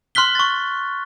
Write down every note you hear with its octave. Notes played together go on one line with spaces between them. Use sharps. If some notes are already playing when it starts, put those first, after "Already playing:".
C6 F6 F#6 B6 G7
C#6 A6